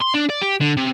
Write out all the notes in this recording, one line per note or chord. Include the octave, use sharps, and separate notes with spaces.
C6
D4
D5
G4
D3
C3